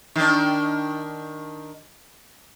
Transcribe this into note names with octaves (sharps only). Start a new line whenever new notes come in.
D#3 D4